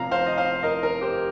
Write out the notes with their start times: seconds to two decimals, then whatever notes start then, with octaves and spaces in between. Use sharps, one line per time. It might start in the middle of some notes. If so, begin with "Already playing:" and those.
Already playing: F1 F2 F3 F5 A#5
0.11 C5 F5
0.27 D#5
0.38 C5 F5
0.63 A#4 D#5
0.83 A#4
1.01 G4 C5